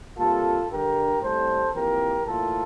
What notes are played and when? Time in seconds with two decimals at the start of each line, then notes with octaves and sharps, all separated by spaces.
0.17 C3 G3 A#3 F4 A4
0.70 G2 D3 G3 G4 A#4
1.21 A2 G3 C4 A4 C5
1.74 F2 E3 A#3 G4 A#4
2.26 A2 E3 A#3 F4 A4